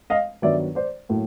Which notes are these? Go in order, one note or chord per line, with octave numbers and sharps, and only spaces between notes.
D#5 F5
G2 D#3 F#3 B3 D5 E5
C5 D5
A2 F#3 A#3